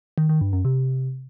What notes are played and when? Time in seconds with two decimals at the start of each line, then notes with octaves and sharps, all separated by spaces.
0.18 D#3
0.29 D#3
0.41 G2
0.53 F#2
0.65 C3